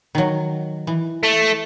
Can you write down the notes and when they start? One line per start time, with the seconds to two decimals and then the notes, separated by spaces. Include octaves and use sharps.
0.15 D#3 F#3
0.87 E3
1.23 A3